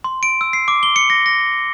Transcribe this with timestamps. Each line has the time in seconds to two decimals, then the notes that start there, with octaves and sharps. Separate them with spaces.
0.04 C6
0.23 D7
0.41 E6
0.53 C7
0.68 D6
0.83 G7
0.96 C#7
1.10 A#6
1.26 A#6